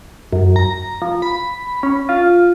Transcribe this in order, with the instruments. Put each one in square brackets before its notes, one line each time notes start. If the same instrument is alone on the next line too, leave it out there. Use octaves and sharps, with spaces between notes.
[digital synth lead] F#2
A#5
F3
B5
C#4
F4